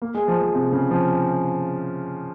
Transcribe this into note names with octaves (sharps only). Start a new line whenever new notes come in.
A#3
G#3
F3
F3
C3
C#3
F3